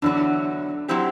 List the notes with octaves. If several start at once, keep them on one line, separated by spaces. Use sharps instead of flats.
E2 D3 F#3 D4
F#3 C4 E4 G4